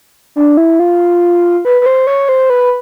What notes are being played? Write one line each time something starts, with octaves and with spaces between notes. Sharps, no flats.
D4
E4
F4
B4
B4
C5
C#5
C5
B4